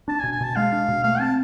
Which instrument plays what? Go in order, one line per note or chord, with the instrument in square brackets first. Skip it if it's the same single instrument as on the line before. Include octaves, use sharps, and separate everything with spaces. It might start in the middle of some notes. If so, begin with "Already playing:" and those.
[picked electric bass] D4 [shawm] A5
[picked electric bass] B2 [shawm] G#5
[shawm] G#5
[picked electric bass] B2 [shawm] A5
[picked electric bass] G#3 [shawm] F5
[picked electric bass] D4
B2
[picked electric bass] A3 [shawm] F5
[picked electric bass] C4 [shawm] A5